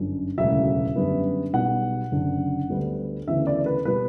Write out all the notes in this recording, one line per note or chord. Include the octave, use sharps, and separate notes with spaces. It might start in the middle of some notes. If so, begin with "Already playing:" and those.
Already playing: G1 F#2 D3
E1 D2 C#3 F#3 E5
F#2 D3 G3 B3
B1 B2 G3 B3 F#5
F#1 F#2 D3
D2 D3 G3 B3
D2 C#3 E3 B3 E5
D5
B4
B2 G3 B3 B4